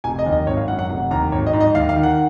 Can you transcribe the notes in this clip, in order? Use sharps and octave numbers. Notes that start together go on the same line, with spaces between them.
F1 G#5
D#5
D#2
D#5
G#1 C#5
F5
F#2 F#5
F#5
F1 F#5
D#2 A#5
G#1 C#5
D#5
G#2
D#5
D#2 F5
F5
D#3
F#5